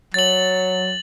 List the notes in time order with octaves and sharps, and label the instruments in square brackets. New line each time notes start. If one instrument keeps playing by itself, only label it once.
[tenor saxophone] F#3 [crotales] A6 F#7